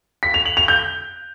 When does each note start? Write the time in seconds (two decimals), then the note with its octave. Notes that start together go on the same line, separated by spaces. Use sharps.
0.23 B6
0.34 F7
0.45 F#7
0.57 F7
0.68 G6